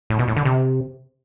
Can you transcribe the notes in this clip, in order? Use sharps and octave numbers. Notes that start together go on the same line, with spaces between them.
A2
B2
A2
D3
C3